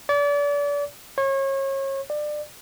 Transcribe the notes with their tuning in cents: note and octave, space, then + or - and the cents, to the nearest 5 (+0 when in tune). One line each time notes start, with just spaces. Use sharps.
D5 -35
C#5 -30
D5 +25